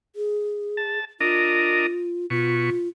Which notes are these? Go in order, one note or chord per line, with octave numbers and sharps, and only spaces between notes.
G#4
A5
D4 F4 A#4 D#5
B2 F4 C#6